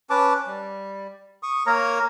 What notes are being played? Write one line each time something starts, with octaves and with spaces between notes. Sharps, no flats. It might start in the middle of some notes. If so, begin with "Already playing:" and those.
C#4 B4 A5 D6
G3
C#6 D#6
A#3 A#4 C#5 A#5